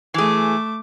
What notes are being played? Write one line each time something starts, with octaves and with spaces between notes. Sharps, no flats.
E3 A3 G#4 D6